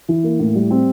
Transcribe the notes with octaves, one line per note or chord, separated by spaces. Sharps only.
E3
A#3
A2
G3
C4